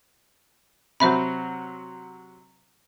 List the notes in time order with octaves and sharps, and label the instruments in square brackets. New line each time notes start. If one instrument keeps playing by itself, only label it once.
[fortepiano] C3 F#3 [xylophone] C5 E5 B5